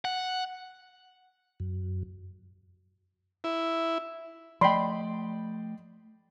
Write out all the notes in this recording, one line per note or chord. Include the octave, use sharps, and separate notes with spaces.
F#5
F#2
E4
F3 A3 D5 D#5 G5 B5 C6